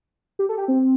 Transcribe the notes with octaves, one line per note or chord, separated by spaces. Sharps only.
G4
A4
G4
C4